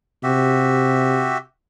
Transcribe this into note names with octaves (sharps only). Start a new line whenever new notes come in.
C3 F#4 G4 E5